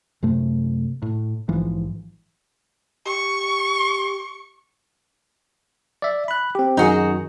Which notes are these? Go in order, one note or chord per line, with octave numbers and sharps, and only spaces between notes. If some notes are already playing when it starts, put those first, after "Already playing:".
F#2 C3 A3
A2
A#1 G#2 E3 F3
G4 C#6
D5 E5
B5 F#6
C4 G4
F#2 D#3 D#4 F#4 G#4